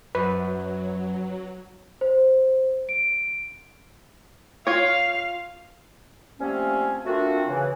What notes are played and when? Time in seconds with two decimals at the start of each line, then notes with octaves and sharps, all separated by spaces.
0.15 F#2 F#3 B4
2.01 C5
2.89 D7
4.67 F4 C#5 F5
6.39 F3 G3 A3 A#3 C4 C#4
7.05 A3 A#3 C4 D4 F4 F#4
7.47 C#3 E3